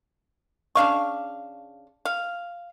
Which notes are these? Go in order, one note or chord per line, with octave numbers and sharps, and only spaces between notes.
C#3 D4 F5 C#6
F5